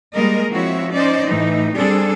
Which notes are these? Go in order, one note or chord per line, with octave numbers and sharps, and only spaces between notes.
G3 G#3 A#3 A#4 D#5
F3 C4 E4 F#4 C#5 E5
C#4 D#4 C5 D5 D#5
A2 E3 D#4
G3 C4 D4 G#4 A4